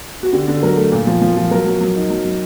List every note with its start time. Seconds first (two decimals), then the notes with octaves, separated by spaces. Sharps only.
0.23 F#4
0.33 D3 G4
0.48 D3
0.63 F#3 A#4
0.77 A3
0.92 A#2
1.07 F3
1.22 F3
1.37 F3
1.51 F#3 A#4
1.66 F#3
1.81 F#3
1.96 D#4
2.10 F#3
2.25 F#3